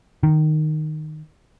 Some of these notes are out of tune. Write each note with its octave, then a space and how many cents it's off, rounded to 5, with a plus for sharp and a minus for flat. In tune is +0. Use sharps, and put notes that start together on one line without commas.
D#3 -10